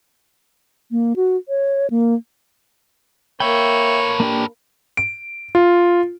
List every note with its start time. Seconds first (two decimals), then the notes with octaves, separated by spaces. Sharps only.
0.91 A#3
1.16 F#4
1.48 C#5
1.90 A#3
3.40 A#3 A4 B4 C#5 E5 G5
4.20 A#3 D4 G4
4.97 D7
5.55 F4